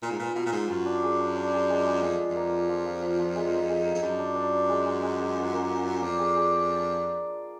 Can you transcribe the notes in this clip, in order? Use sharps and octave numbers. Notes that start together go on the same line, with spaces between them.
A#2 F4
G#2
A#2 B4
B2 F4
A#2
G#2 F4
F#2 F4
D4
G#4
D4
D4
G#4
G#3
G#3
F2 G#4
F4
F2
A#3
F4
F3
F3
F3
F3
G#3
D#4
G#3
D#4
F2
F#2 D4
D4
D4
D4
G#3
G#3
G#3
G#3
F4
A#3
A#3
F4
F2 D5
G#4
G#4
D5
D4